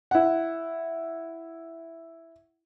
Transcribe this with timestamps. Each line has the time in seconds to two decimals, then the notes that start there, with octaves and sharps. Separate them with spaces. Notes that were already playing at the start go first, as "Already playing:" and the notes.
0.11 E4 F#5